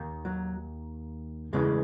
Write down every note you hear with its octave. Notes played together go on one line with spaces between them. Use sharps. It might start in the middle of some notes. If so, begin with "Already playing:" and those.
Already playing: D#2 D#3
F#3
E2 C#3 E3 G#3